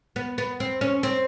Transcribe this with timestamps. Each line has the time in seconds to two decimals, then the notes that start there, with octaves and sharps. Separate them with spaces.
0.16 B3
0.38 B3
0.60 C4
0.81 C#4
1.03 C4